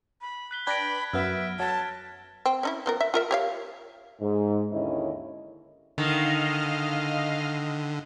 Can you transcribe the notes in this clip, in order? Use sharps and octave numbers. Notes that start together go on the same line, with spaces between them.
B5
F#6 B6 G7
D4 B4 G5 B5 G#6 A#6 D7
F#2 B3 E5 F6
F#3 A5 F6 G#6
C4
C#4 D#4 E4
F3 B3 A#4
E5
F4 A#4 E5
G4 C#5 F5
G#2
D#2 D3 C#4 E4 C#5 D#5
D3 D#3 D#5 F5 F6